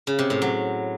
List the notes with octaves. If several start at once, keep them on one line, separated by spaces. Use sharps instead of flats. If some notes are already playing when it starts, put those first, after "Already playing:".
C#3
C3
A2
F#3